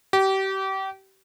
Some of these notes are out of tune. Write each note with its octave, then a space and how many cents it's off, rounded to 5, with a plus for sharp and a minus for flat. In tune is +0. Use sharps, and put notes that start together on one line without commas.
G4 -30